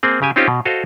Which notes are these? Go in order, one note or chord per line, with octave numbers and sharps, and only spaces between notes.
A#3 C4 G#4
C#3 G4 G#5
C4 C#4 D#4 F4 G4 C5
B2
F#4 A4 C5 D#5 F5